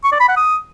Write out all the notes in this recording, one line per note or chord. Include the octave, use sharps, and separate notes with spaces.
C#6
D5
B5
F#5
D#6